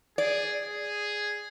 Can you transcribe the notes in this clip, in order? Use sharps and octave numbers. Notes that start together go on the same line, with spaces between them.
G#4 D5
G#4